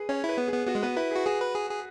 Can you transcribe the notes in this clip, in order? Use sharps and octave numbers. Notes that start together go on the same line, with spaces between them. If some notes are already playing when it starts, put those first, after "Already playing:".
Already playing: G#4 B4
C#4 C#5
E4 B4
B3
G#4
B3
B3 F#4
G#3
B3 B4
E4 B4
F#4 G#4
F#4 G#4
B4
G#4
G#4